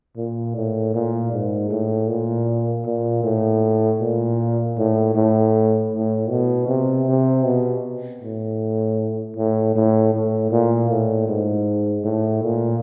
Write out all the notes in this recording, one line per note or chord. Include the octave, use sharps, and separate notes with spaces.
A#2
A2
A#2
G#2
A2
A#2
A#2
A2
A#2
A2
A2
A2
B2
C3
C3
B2
A2
A2
A2
A2
A#2
A2
G#2
A2
A#2